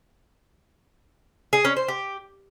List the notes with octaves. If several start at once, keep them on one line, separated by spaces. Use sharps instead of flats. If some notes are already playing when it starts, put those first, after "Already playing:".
G#4
C#4
C5
G4